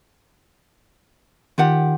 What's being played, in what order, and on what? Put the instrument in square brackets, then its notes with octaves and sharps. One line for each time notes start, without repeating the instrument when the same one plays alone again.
[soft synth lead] D#3 [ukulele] F4 G4 F#5